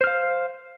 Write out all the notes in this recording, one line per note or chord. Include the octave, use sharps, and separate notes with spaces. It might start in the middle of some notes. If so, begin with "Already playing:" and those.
C5 F5 F6